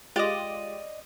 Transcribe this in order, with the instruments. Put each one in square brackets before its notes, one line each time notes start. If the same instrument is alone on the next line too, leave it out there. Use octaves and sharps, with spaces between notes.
[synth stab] G#3 F4 G4 [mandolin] D5 D#5